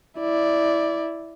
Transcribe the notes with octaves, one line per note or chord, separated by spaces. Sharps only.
E4 D5